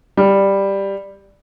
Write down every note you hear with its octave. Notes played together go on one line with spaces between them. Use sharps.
G3